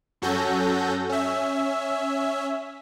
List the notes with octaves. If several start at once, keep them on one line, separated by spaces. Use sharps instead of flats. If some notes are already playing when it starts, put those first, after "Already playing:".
F#2 C#4 F#4 A4 G6 A#6
C#4 E5